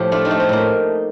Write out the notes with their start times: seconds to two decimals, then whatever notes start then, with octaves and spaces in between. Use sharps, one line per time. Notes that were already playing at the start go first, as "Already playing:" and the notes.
Already playing: A2 F3 G4 A4
0.12 A3 D4 F4
0.25 C4 D#4
0.31 A3
0.40 C4
0.49 A2 A#3